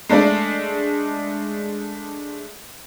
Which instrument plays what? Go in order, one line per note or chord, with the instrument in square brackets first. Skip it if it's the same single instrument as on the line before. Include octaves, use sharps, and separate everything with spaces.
[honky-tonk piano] G#3 A3 D4 D5